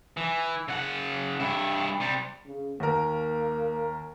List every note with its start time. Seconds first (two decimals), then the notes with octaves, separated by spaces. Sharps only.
0.17 E3
0.68 C#3 F#5
1.40 G2 E4
2.00 C3 G3
2.46 C#3
2.80 D#2 A#3 A#4